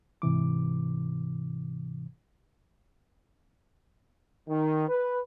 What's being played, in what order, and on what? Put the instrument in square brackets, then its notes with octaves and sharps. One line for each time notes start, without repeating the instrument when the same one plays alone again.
[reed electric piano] G#2 C3 E3 D6
[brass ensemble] D#3
B4